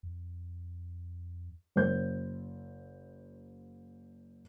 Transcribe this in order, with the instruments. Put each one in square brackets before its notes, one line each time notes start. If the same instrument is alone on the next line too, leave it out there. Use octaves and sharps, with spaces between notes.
[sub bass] F2
[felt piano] F#1 C5 G6